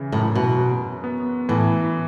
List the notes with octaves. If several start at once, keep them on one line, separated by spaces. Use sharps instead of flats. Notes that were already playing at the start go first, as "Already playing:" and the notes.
Already playing: C#3 E3
F#2 A2
B2
F#4
B3
A2 E3